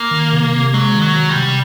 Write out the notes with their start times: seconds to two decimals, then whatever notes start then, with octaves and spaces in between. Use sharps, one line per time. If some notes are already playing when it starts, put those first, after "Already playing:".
Already playing: A#3
0.11 D#3
0.33 C3
0.53 C3
0.74 F#3 G#3
0.95 D#3
1.02 F#3
1.16 C3
1.29 G3
1.36 C3